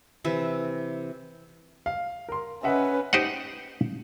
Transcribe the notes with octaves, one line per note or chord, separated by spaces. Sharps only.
C3 E3 E5
F5
A#4 C6
C#4 B4 D#5 E5 F#5
D#4 G4 C5 D#5 F#5